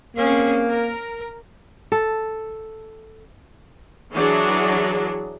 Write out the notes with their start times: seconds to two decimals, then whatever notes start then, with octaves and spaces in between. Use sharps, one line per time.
0.17 A#3 C4 C#4 G#4
0.69 A#4
1.92 A4
4.13 E3 F#3 D4 G#4